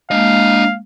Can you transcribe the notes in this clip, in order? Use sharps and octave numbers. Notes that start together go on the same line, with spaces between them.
G#3 A#3 D4 D#5 F5